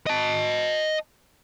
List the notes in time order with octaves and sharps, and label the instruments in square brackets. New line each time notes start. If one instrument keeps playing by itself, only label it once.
[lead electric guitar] D#5 A5